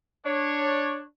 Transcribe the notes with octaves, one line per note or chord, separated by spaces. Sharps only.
D4 C#5